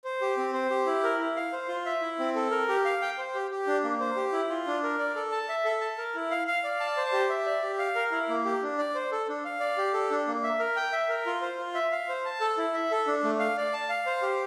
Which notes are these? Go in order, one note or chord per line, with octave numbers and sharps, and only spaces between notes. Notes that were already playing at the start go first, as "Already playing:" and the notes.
C5
G4
C4
C5
G4
E4
A#4
E4
F5
C5
F4
E5
E4
C4
A4
A#4
G4
F5
G5
C5
G4
G4
D4
A#3
C5
G4
E4
F4
D4
A#4
D5
A4
A5
E5
A4
A5
A#4
E4
F5
F5
D5
A5
C5
G4
E5
D5
G4
F5
A#4
E4
A#3
G4
D4
D5
C5
A4
D4
F5
D5
G4
A4
D4
A#3
E5
A#4
G5
E5
A#4
F4
C5
F4
E5
F5
C5
A5
A4
E4
E5
A4
D4
A3
F5
D5
A5
F5
C5
G4